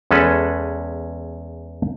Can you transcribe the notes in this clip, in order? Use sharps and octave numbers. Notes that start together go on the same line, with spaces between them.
E2 G#3 C#4 A4 B4